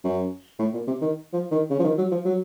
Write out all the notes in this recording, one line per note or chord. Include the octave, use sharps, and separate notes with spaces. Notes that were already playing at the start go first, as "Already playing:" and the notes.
F#2
A2
A#2
C3
D#3
F3
D#3
C#3
F3
D#3
F#3
F3
F#3